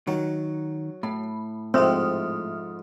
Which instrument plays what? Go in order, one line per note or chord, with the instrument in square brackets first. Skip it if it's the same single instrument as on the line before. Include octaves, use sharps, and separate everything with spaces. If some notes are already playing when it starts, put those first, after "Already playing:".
[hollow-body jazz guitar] D#3 [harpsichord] F#3
[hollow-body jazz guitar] A2 [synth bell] B5
[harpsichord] F2 G#2 [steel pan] C4 [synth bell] E5 D#6 F6